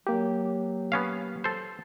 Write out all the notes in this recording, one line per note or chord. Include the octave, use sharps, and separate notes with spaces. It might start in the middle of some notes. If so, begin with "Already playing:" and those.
F#3 A#3 G4
B3 C#4 F5
A4 C5